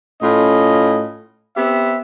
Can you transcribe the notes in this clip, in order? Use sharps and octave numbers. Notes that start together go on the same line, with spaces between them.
A2 C#4 F4 D#5
B3 C4 G4 E5